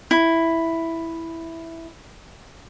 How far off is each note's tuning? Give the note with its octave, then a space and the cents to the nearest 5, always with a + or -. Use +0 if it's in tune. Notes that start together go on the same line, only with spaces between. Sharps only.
E4 +0